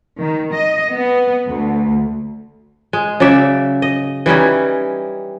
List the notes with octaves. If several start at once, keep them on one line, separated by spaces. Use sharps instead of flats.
D#3
D#5
B3
D2
G#3
C#3 F#3 D5 E5
D#5
E3 G3 C#4 D#4